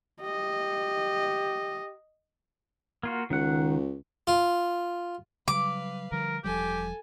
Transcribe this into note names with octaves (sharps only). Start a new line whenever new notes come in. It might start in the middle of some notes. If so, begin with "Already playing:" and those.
G4 D#5
A#3 F4 F#4
C#2 D#3 F#5
F4
C#3 F#3 G3 B4 F5 D6
D3 F3 G3 A#4
E1 F3 G3 G4 A4 G#5